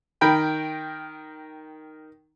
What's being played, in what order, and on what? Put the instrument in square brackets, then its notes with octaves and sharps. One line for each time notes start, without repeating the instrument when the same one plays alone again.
[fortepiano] D#3 A#4 G5 B5